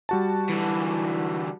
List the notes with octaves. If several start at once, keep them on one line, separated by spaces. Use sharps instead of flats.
G3 F#4 A5
D3 E3